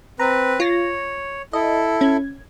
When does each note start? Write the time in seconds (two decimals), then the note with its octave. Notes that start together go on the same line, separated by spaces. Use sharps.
0.20 C4 B4 A#5
0.60 F4 C#5 A#6
1.53 E4 A4 D#5
2.01 C#4 G#6